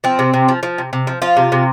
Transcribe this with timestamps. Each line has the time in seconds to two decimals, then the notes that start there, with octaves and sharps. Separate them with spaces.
0.04 F3 C4
0.19 C3
0.34 C3
0.48 F3
0.63 F3
0.78 C3
0.93 C3
1.07 F3
1.22 F3 F4
1.37 C3
1.52 C3